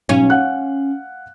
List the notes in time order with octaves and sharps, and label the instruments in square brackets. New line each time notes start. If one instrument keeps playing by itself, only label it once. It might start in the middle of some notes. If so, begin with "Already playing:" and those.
[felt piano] B1 [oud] C#4
[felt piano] F5 F#5 F#6